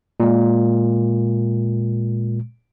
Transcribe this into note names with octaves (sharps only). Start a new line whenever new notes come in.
A#2 G#3